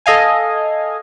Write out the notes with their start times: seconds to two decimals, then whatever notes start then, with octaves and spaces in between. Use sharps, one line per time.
0.06 A4 D#5 F5 G#5